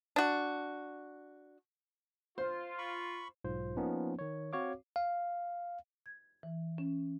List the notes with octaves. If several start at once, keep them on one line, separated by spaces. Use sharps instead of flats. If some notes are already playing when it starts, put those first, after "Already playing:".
D4 F#4
F4 C5
B5 C#6
B1 G#2 F4 C5
F3 A#3 B3 C#4 D#4
D#3 C#5
C4 F#4 C#5 F5 D6
F5
G#6
E3
C#4